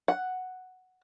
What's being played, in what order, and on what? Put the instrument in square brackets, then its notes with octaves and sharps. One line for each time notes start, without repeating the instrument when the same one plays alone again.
[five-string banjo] F#5